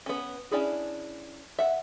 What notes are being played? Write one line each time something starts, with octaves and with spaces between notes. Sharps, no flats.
B3 C#4
C#4 D4 E4 G#4
E5 F#5